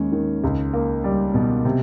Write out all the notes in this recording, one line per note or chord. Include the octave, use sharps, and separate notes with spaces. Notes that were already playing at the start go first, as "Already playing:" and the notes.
Already playing: D#2 G#3 C#4
D#3
C#2
A#3
G3
B2
C3